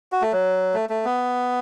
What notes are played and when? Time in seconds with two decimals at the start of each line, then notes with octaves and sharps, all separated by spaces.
0.12 F#4
0.22 A3
0.33 F#3
0.74 A3
0.89 A3
1.05 B3